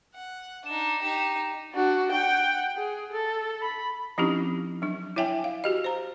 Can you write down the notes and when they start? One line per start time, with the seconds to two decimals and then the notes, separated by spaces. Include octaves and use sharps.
0.15 F#5
0.65 D4 D#4 E7
1.01 D#4 G4
1.74 D4 F#4
2.11 F#5 G5
2.76 G#4
3.12 A4
3.61 B5
4.18 F3 C4 C#4 D#4 E4 G4
4.82 F#3 D4
5.16 E4 C#5 E5 G5 G#5
5.44 F5
5.64 F#4 G4 D#5
5.84 C5 A#5